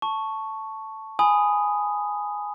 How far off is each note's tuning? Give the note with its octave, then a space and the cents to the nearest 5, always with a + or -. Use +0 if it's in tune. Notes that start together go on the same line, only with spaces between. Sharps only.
A5 +0 C#6 +0
G#5 +0 B5 +15 D#6 +0